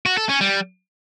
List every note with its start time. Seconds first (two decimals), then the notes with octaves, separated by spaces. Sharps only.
0.06 F#4
0.17 A4
0.29 C#4
0.41 G3